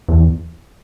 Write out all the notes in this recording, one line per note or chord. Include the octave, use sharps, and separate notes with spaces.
E2